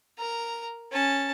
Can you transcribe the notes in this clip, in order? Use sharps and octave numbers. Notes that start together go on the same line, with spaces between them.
A#4 A#5
C#4 A5